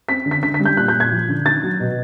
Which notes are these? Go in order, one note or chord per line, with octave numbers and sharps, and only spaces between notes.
C4 B6
D3
B6
D3 B6
B6
G3
G6
A#2 F#6
G6
A#2
G#6
F3
D3
D#3 A6
F#3
B2